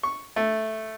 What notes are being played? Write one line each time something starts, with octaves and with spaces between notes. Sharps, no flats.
C#6
A3